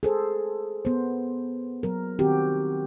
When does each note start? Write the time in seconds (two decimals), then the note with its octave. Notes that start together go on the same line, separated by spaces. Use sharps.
0.03 G#4 A4 C5
0.85 B3 C5
1.83 F#3 A#4
2.19 D#3 C4 F#4 G4